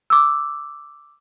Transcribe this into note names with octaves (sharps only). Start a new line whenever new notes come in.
D6 E6